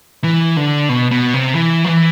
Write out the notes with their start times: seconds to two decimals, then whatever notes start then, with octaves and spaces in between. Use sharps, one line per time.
0.24 E3
0.57 D3
0.89 B2
1.11 B2
1.34 C3
1.55 E3
1.84 F3
1.89 E3